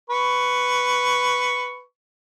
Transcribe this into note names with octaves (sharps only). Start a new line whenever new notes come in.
B4 C#6